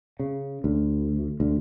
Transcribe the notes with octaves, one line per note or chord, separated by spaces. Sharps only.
C#3
D2
D2